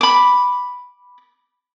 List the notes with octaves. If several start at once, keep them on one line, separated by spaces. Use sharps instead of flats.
B5 D6